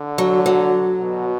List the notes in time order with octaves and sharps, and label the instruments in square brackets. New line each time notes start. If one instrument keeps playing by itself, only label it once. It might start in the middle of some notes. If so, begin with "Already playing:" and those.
Already playing: [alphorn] D3
[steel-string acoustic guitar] F#3
F#3
[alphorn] B2